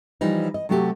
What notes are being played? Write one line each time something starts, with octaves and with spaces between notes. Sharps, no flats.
E3 F3 G3 D#4
D#5
C3 F#3 A3 F#4 G4